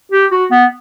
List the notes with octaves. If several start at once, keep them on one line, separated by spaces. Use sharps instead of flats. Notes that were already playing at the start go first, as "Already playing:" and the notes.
G4
F#4
B3